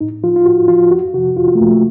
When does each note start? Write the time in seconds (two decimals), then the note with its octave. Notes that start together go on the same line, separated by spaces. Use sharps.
0.01 A2 D#4
0.23 F3 F4
0.36 F4
0.46 A2 F#4
0.68 F3 F4
0.91 F2 F#4
1.14 C3 F#4
1.17 F3
1.37 F2 F4
1.48 F4
1.55 A3
1.59 C3 A#3
1.62 F3
1.71 A3